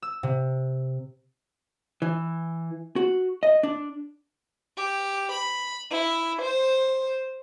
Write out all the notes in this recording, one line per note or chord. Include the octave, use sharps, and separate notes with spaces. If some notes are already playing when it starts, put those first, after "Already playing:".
E6
C3
E3
F#4
D#5
D4
G4
B5
E4
C5